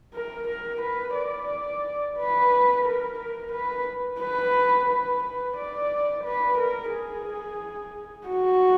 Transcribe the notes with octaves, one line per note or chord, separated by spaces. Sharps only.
A#4
A#4
B4
D5
B4
A#4
A#4
B4
B4
B4
B4
D5
B4
A#4
G#4
F#4